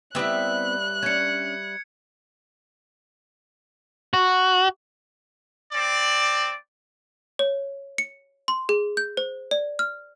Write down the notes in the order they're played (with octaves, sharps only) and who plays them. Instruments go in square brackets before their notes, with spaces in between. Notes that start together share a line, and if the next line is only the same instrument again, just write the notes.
[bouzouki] G3 E5 [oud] B3 C4 E4 [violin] F#6
[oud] C#4 D4 [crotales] G#6 C#7
[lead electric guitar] F#4
[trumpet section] C4 D5
[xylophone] C#5
C#7
C6
G#4
G6
C5
D5
F6